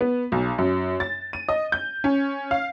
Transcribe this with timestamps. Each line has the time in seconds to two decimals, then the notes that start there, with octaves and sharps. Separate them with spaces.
0.01 B3
0.32 B1
0.58 F#2
1.00 A6
1.33 D#7
1.49 D#5
1.72 G6
2.04 C#4
2.51 F5